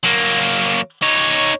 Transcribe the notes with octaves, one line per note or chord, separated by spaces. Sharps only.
F#3 A#3
D#4 C#5